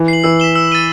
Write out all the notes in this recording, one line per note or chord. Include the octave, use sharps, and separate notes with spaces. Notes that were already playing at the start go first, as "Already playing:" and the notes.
Already playing: E3
C7 F#7
E3 E6
B6 E7 G7
E6
A6 D#7 G7